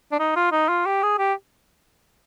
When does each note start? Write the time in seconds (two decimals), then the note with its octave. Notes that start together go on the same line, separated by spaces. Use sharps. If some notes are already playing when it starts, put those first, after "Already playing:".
0.12 D4
0.19 D#4
0.36 F4
0.52 D#4
0.69 F4
0.86 G4
1.03 G#4
1.18 G4